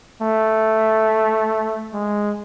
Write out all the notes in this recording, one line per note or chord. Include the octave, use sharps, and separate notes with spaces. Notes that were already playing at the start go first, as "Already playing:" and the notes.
A3
G#3